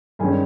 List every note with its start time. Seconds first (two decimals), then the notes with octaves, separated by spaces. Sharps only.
0.19 G2 D#3 G#3 C#4 G#5